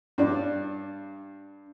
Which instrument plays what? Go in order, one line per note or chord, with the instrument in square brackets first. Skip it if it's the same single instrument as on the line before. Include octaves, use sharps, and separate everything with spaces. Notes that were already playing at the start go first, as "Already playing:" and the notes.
[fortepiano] G2 D5